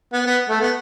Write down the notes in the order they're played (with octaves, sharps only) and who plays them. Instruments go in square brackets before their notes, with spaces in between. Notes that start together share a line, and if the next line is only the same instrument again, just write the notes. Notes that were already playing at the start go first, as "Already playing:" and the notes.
[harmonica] B3
B3
A3
B3